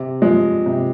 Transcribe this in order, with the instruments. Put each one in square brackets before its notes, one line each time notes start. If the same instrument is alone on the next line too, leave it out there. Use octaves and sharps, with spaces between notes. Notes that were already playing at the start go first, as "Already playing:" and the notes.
Already playing: [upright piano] C3
F3 G#3
C3